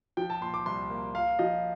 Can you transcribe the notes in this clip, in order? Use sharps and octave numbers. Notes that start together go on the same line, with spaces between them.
F3 G5
A5
A#2 C6
D6
C2 C6
A#3
A#3 F5
F3 D#5